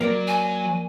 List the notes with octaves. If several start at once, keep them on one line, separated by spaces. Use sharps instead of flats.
F#3 A#3 A#4 D5
G#5